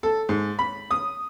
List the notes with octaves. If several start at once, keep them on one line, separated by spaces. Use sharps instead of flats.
A4
G#2
B5
D#6